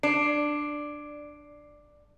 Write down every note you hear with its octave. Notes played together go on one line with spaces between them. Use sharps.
D4 D5 C7 D7